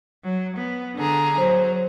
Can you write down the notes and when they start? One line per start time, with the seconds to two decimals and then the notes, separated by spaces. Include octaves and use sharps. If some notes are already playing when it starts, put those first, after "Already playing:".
0.23 F#3
0.56 B3
0.96 D3 G#4 A#5
1.38 F#3 C5